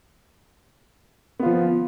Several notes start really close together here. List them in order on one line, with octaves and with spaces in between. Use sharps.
B3 F4 F3